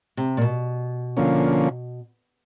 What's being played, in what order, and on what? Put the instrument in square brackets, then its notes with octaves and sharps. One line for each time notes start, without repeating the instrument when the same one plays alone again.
[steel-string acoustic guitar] C3
A#2
B2
[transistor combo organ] D3 F3 A#3 C#4